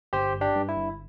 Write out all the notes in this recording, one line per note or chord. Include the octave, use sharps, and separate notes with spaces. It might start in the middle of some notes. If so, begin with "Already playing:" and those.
G1 G4 C5
G2
D4 G4
G2
E4
G1